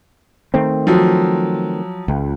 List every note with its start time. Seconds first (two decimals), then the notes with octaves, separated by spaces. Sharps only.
0.54 D#3 A3 C4
0.87 F3 F#3
2.08 C#2